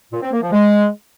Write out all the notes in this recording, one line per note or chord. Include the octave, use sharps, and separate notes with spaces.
A#2
C4
A#3
F3
G#3